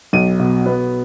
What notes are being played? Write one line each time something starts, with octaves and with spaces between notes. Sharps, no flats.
B1 D#7
B2
B3